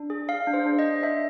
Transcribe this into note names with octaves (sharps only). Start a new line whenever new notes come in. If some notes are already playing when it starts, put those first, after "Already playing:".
Already playing: D4
G#4
G#4 F5
D4
C5
D4
D#5
D4
D4 E5